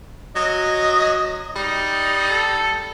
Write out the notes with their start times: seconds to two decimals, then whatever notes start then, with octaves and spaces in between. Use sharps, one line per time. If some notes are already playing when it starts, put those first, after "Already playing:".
0.36 F#3 D#5
1.56 G3 D#4
2.30 A4